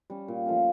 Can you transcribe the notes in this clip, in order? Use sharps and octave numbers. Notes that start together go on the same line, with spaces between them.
G3 C#4
A#2
F3 A3 C#4